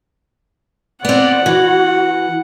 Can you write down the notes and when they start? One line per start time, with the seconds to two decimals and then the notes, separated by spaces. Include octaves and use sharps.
1.05 B3 C4 D5 F#5
1.46 E3 F#4